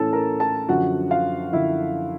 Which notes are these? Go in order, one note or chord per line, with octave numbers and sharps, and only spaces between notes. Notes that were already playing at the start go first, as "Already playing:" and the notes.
Already playing: A2 E3 A3 C#4 E4 A4 A5
A#4 A#5
A4 A5
F#2 D3 F3 F#4 F#5
F4 F5
F#2 D3 F3 E4 E5